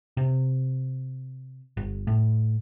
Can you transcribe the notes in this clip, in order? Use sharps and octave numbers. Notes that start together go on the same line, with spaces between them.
C3
G1
A2